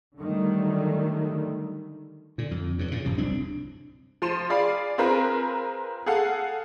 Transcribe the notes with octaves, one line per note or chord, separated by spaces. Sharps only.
D3 D#3 F#3 G3 A3
A#2 D3
F2
G2 C#3
A#2 C#3
A1 F#2 C3
D#1 C2 C4 D4
F3 C6 D#7 E7
G#4 D5 F5 B5
C4 F4 G#4 A#4 B4
G#4 A4 F5 F#5